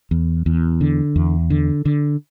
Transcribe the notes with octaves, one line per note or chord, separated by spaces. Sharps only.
E2
E2
D3
E2
D3
D3